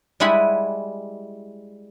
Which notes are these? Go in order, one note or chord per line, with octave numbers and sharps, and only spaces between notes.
G3 G#3 E4 F#5 G#5 B5